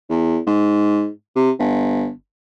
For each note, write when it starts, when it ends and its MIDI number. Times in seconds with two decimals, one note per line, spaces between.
0.09 0.39 40
0.46 1.08 44
1.36 1.50 48
1.59 2.09 31